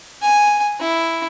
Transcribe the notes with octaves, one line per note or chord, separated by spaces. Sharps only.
G#5
E4